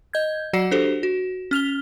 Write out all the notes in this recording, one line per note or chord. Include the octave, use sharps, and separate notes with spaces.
D#5 G6 G#6
F#3 F#4 D5 F#5 C7 C#7
D4 F#4 G4 A4 C5
F#4
C#4 F6 F7 G7